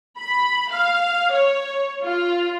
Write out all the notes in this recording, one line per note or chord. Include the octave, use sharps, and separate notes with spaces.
B5
F5
C#5
F4